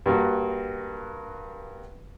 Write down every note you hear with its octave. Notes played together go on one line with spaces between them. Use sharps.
G2 A#3 F#4